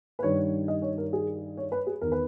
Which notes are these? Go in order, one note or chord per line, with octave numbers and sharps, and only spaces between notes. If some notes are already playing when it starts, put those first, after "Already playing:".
B4
G2 D#3 C#5
D#5
C#5
A#4
G#4
C#5
B4
G#4
E2 D#3 A#4
B4